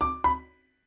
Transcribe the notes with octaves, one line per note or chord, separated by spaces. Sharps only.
D6
B5